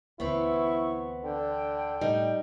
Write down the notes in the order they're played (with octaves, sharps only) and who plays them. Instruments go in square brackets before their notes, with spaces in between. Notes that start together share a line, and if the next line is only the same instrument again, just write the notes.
[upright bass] D2 E3 [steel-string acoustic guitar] B3 C4 [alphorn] E4 [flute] C#6
[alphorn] D3 [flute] G5
[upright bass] A2 [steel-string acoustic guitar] G3 D#4